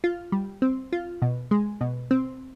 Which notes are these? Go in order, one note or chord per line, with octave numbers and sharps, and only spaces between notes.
F4
G3
C4
F4
B2
G#3
B2
C4